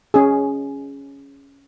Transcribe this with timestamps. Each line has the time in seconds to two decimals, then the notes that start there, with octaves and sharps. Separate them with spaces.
0.14 C#4 G#4